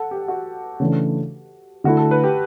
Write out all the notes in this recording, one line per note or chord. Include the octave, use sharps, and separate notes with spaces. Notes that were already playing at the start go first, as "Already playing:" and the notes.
Already playing: A4 F#5
G4
F#4
C#3 E3 A3 D4
D3 A3 E4 F#4
A4
B4
G4